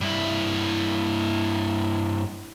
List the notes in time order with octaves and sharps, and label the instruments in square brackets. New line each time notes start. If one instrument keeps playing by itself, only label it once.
[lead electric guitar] G2 E4